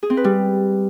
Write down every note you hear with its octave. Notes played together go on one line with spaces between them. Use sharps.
G#4
C4
B4
G3